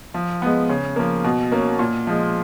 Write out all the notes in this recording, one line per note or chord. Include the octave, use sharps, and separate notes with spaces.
F3
G#3 B3
C#3
F3 A#3
B2
A#3 C#4
A#2
F3 G#3